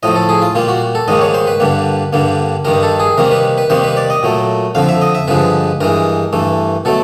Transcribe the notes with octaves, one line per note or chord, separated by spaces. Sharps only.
A2 F3 A3 D#5
A4
G#4
F4
A#2 G3 A#3 F4
F#4
A4
G#2 D#3 G3 A#3 D#5
C#5
C5
B4
G2 D3 G3 A#3
G2 D3 G3 A#3
G2 D#3 G3 A#4
A4
G#4
C3 D#3 G3 A#3 A#4
B4
B4
C3 D#3 G3 A#3 C5
B4
D5
D#5
A#2 F#3 A3
F2 D3 F3 F5
E5
D#5
E5
G2 D3 F3 G#3 B4
G2 E3 G#3 A#4
G2 E3 A3
B2 F#3 A3 A4